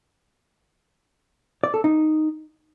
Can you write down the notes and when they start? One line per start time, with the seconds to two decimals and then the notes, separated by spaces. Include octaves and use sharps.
1.64 D5
1.74 A4
1.84 D#4